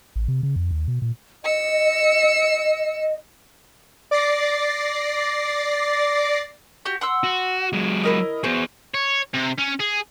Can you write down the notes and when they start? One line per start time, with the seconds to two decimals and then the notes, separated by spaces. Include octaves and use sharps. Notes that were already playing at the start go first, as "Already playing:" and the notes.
0.16 A1
0.28 C3
0.43 C#3
0.56 F2
0.71 D#2
0.88 B2
1.02 A#2
1.44 D#5 E6 C#7
4.11 D5 D6 A6 A#6 C7
6.85 F#4 G4
7.01 F#5 C6 E6
7.23 F#4
7.73 F#3 G#3
8.04 E4 A#4 D#5
8.44 B3 F#4 G#4 C5 C#6
8.94 C#5
9.34 C3
9.59 C#4
9.80 G#4